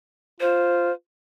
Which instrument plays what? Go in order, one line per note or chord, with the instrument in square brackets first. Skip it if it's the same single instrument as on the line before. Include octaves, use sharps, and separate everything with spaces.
[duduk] F4 [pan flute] C5